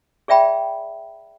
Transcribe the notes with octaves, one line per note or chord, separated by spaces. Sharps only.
G#4 D5 E5 G5 B5